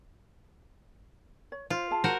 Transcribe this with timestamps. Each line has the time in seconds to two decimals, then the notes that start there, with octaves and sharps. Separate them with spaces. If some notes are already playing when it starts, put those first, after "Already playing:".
1.52 C#5
1.70 F4 C5
1.91 G#4 F5 A5
2.04 F#4 A#4 C5